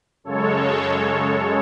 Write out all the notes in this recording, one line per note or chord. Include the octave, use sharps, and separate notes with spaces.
F#2 C#3 G#3 A4 C#5